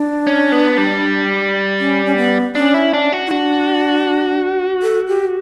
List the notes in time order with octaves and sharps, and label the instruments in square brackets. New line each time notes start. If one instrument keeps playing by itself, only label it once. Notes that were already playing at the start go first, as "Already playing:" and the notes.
Already playing: [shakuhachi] D4
[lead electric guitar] C#4
B3
G3
[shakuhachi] C#4
C#4
B3
[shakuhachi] C#4 [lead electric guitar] D4
[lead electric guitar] E4
D4
F#4
[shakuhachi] E4
[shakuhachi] D4 [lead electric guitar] F#4
[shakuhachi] A4
G4